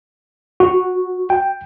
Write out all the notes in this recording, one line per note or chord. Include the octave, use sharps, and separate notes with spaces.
F#4
G5